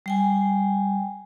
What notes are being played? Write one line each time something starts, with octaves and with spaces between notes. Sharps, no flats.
G3 G5 G#5